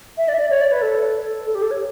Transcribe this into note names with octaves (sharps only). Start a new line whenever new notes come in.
E5
D5
E5
D5
C#5
D5
B4
A4
A4
G4
A4
C#5